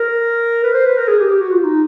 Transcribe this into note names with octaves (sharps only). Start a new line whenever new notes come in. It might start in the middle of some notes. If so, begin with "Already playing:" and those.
Already playing: A#4
B4
C5
B4
A#4
G#4
G4
G4
F#4
F4
D#4